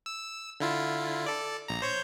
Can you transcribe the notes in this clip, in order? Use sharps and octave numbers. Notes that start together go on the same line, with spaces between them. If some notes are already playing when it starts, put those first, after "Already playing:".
E6
D3 E4 F4
A4 D5
A#1 A#5
C5 C#5 G6